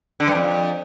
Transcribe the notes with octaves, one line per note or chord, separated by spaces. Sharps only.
D3
G2
F2